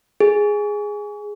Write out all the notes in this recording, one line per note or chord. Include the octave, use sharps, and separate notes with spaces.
G#4